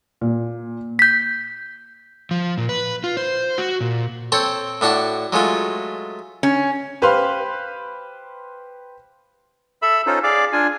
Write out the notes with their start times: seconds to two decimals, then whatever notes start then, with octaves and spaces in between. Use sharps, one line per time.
0.21 A#2
0.99 G6 B6
2.31 F3
2.58 A#2
2.69 B4
3.04 F4
3.17 C5
3.58 F#4
3.81 A#2
4.32 C4 A4 C5 C#5
4.81 A2 D4 F#4 A5
5.33 F#3 G#3 A3 F4
6.43 C#4
7.02 G4 B4 C5 F5 C6 F6
9.82 A4 E5 B5 E6
10.06 C#4 D#4 F4 A4 C5
10.23 G#4 D5 F5 D6
10.53 D4 F4 G#5